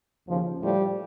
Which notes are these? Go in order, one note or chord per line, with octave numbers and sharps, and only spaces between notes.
D#2 C#3 F3
A2 F3 G3